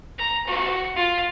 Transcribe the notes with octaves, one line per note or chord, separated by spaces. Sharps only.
A#5
F#4
F4